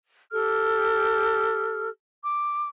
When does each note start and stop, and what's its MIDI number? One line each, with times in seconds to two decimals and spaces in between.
0.32 1.89 67
0.32 1.89 69
0.32 1.89 89
2.25 2.69 86